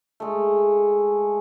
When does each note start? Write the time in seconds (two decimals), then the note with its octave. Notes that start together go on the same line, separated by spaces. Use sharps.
0.20 G#3 A3